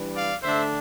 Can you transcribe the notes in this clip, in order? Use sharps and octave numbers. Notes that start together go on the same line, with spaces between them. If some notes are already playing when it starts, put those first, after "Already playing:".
Already playing: E3 G3 D4
D5 F5
D3 A3 D4 C5 E5